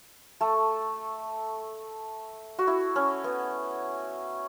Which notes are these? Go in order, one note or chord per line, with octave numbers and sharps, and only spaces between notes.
A3 A4
F#4
E4
C#4
B3